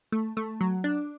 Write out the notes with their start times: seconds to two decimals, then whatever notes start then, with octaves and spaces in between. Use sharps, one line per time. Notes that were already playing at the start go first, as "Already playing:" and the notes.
0.12 A3
0.37 A3
0.61 F#3
0.84 D4